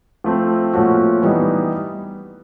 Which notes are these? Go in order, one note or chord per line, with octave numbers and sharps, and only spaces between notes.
F3 A3 C4
A#2 F3 A3 C#4 F#4
E3 G3 B3 D#4